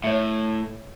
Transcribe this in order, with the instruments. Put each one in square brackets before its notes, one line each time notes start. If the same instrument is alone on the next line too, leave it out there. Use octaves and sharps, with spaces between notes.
[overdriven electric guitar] A2 [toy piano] C#5 E5